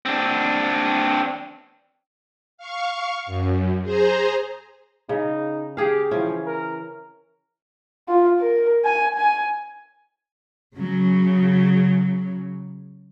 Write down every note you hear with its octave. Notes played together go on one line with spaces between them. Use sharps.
C4 D4
F5 C#6
F#2
G#4 C5 A#5
C#3 D#4
G4 G#4 F5
E3 F3 C#4
A#4
F4
A#4
G#5
G#5
C#3 F#3